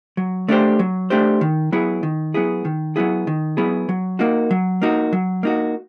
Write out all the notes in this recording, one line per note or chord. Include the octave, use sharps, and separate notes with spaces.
F#3
A3 D4 G4 C5
F#3
A3 D4 G4 C5
D#3
F#3 B3 E4 G#4
D#3
F#3 B3 E4 G#4
D#3
F#3 B3 E4 G#4
D#3
F#3 B3 E4 G#4
F#3
A#3 D#4 F#4
F#3
A#3 D#4 F#4
F#3
A#3 D#4 F#4